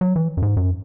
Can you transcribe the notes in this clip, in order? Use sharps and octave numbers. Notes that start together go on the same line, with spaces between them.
F#3
E3
F#2
G#2
F#2